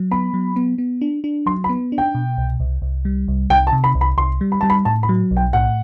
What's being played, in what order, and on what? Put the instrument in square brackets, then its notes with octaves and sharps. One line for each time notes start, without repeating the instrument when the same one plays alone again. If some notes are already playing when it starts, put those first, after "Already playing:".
Already playing: [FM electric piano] F#3
[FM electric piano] B3 [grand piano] B5
[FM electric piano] F#3
B3
B3
D4
D4
[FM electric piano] F#3 [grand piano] C6
[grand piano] B5
[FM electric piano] B3
D4
[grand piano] G5
[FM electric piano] B2
C2
C2
C2
G3
C2
[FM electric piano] C2 [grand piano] G5
[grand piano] A5
[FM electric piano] C3
[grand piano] B5
[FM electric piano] C2
[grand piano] B5
[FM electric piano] C2 [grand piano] C6
[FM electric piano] G3
[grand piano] B5
[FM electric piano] G3 [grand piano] A5
[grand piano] B5
[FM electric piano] A2 [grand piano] A5
[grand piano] B5
[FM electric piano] F#3
B1
[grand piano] G5
[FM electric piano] A2 [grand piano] F#5